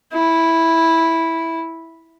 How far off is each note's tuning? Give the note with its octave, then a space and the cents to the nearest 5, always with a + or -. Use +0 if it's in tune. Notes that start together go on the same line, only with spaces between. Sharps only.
E4 -5